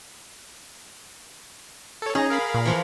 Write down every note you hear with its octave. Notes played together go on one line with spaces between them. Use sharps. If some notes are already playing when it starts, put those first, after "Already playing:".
A4 C#5
C#4 D#4 G#4 A#5
A#4 F5 B5
A#2
E3 F3 F4